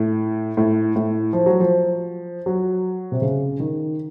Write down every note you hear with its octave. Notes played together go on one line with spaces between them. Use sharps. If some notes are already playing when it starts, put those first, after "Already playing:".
Already playing: A2
A2
A2
F3
F#3
F3
F#3
C3
C#3
D#3